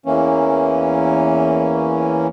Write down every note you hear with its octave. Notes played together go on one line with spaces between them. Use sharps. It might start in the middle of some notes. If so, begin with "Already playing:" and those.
E2 E3 A#3 C#4